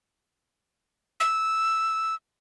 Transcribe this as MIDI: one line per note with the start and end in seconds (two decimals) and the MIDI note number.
1.20 2.15 88